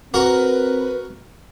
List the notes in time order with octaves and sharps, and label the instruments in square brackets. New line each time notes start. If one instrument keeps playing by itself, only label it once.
[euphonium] C4 [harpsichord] F#4 A#4 [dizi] B4